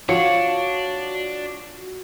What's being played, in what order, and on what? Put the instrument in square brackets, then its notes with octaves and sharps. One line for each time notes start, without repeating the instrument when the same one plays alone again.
[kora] F3 [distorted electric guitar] D4 [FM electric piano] F#4 [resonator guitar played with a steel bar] C#5